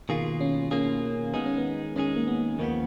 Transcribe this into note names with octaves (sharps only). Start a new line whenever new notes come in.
B2 D#3 A#3 F4 G#4
C#4
B2 A#3 C#4 F4 G#4
D#3 G#3 B3 D#4 G#4
C#4
B3
D#3 G#3 C#4 D#4 G#4
A#3
B3
D#2 C#3 F3 A#3 B3